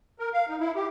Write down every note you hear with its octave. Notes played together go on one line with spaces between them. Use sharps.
A#4
F5
D#4
E4
G4